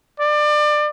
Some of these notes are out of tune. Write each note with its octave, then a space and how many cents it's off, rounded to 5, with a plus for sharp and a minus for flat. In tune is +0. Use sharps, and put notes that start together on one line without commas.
D5 +25